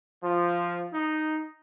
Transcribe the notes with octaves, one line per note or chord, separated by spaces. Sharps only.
F3
D#4